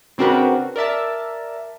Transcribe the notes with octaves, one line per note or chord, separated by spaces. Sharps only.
C#3 C4 D4 F#4 A#4 B4
A#4 D5 E5 A5